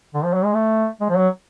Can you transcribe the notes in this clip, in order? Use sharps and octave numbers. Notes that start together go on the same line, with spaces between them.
D3
F3
F#3
G#3
A3
G#3
F3
F#3